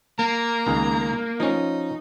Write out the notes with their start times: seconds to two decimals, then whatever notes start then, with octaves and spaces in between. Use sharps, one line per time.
0.19 A#3 A#5
0.67 C#2 D#3 G#4
1.40 F3 C#4 D#4